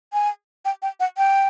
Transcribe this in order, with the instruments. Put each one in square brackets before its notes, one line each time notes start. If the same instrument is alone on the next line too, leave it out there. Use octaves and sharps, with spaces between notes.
[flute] G#5
G5
G5
F#5
G5